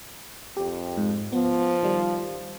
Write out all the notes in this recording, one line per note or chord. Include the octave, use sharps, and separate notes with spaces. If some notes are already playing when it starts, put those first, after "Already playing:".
F2 G4
G#2
F3 B3
D#3 G3